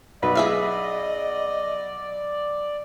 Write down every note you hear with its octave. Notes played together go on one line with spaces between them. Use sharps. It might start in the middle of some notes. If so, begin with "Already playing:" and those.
B1 F#4 B4 D5 D#5
G#4 E5 F5